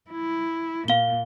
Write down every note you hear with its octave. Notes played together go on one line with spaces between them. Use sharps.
E4
A#2 F5 G7